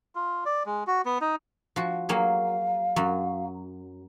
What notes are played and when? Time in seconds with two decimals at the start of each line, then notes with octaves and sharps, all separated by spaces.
0.15 F4
0.45 D5
0.66 G#3
0.87 F#4
1.05 B3
1.21 D#4
1.76 F3 F#4
2.09 F#3 A#3 G#4 F5
2.96 F#2 F#3